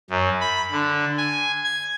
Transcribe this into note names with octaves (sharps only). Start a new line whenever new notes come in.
F#2
B5
D3
G#5
G#6